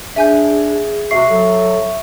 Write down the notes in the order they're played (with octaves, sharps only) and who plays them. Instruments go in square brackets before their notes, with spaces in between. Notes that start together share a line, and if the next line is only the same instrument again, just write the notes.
[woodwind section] D4 [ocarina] G#4 [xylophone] E5 G#5 G6
[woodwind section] C3 F#4 [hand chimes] E5 C#6 [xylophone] C7
[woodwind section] F#3 [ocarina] A4